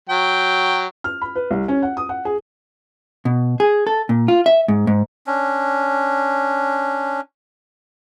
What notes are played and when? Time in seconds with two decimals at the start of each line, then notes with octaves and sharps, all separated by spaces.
0.09 F#3 G5
1.04 F6
1.22 B5
1.35 B4
1.51 C2
1.68 C#4
1.82 F#5
1.97 D#6
2.09 F#5
2.25 G#4
3.25 B2
3.60 G#4
3.87 A4
4.09 A#2
4.28 F4
4.46 E5
4.68 G#2
4.87 G#2
5.27 C#4 D4